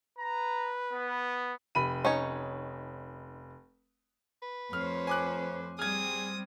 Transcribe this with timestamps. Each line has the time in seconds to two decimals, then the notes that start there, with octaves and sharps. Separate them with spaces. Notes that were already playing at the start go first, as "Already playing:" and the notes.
0.19 B4 A#5
0.93 B3
1.75 F1 B5 D#7
2.05 C#4 D#4 C#5
4.42 B4
4.73 F2 A3 C5 C#5 F6
5.07 G#5 D6 F#6
5.79 G3 C4 G#4 D#6 F6 G#6